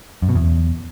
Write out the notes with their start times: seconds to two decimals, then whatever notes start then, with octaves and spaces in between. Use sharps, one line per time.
0.22 F#2
0.29 B2
0.35 E2